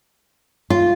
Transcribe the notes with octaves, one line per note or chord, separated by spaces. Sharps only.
F4